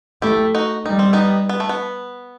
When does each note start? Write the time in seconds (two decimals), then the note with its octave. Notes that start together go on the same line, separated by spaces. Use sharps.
0.22 A3 E4 G4
0.54 D#4 F#4
0.86 G3 D#4
0.99 C4
1.13 B3 D#4
1.49 B3
1.60 A3
1.69 B3